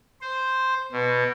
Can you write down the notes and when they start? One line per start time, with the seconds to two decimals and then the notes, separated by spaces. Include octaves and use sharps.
0.21 C5
0.92 B2